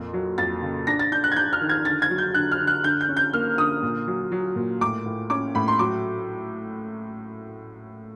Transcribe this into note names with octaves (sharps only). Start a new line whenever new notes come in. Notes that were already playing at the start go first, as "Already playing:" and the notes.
Already playing: F2 A#2
F#3
F2 A6
C#3
D4 A#6
A6
D4 G6
F#6
G#6
D4 G6
F6
D#3
G#6
D3 A6
G#6
F#3
G6
D3 F#6
F6
D3
F#6
D3 G6
G6
C#4
G6
A#3 F6
D3 D#6
A#2
F#3
F#3
A#2
A2 D6
A2
C#4 D6
A2 B5
C6
F#3 D6